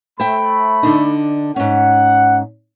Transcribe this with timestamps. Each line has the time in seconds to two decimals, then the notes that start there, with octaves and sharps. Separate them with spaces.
0.20 A3 C5 E5 G5 B5
0.83 D3 D4 D#4
1.56 G#2 C#4 F#5